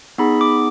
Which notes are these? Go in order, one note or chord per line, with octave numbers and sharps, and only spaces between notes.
B3 D#4 G#4 B5
D6